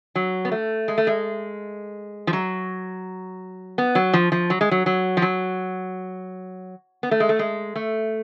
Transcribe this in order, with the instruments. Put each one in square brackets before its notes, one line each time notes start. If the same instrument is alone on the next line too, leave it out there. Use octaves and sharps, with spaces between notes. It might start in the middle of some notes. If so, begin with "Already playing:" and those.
[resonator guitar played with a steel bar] F#3
B3
A3
G#3
A3
G#3
F3
F#3
B3
F#3
F3
F3
F#3
G#3
F#3
F#3
F3
F#3
B3
A3
G#3
A3
G#3
A3